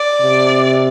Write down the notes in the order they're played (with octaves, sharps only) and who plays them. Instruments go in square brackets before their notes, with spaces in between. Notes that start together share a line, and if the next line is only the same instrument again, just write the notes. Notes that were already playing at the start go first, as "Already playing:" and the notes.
Already playing: [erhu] D5
[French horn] C3